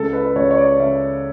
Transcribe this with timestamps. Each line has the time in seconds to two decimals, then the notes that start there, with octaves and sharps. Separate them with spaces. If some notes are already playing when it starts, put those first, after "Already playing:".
Already playing: C#2 A4
0.13 B4
0.25 B4
0.36 C#2 C#5
0.51 C#5
0.57 D5
0.79 C#3 E5